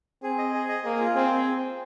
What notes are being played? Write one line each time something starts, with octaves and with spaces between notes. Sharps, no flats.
C4 G#4
D#5
G#4
D#5
A#3 G#4
F4
C4 G#4
G#4